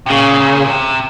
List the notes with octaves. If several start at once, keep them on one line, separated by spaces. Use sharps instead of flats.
C3
A#2 C#3
A#2
C3